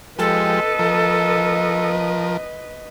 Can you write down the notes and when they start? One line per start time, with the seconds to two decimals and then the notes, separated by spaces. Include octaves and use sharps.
0.19 F3 G#3 G4 A4 B4 D#5
0.79 F3 A#4